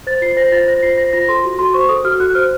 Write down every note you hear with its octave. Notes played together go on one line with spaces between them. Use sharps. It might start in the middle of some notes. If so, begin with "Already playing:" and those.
C5 A6
F4 C7
C5 A#6
F4 A6
C5 A#6
F4 C7
C5 A#6
F4 A#6
A4 C6
F#4
F#4 C6
C5 C#6
A4 D#6
F#4 F6
F#4 F#6
C5 F6